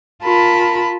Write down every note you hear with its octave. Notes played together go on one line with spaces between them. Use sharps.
F4 A#4 A5 B5